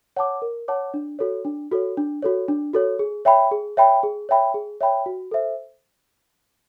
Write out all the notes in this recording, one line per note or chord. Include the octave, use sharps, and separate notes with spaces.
C#5 F#5 A5 D6
A#4
C#5 F#5 A5 D6
D4
F#4 A4 C#5
D4
F#4 A4 C#5
D4
F#4 A4 C#5
D4
F#4 A4 C#5
G#4
C#5 E5 G5 B5
G#4
C#5 E5 G5 B5
G#4
C#5 E5 G5 B5
G#4
C#5 E5 G5 B5
F#4
A4 C5 E5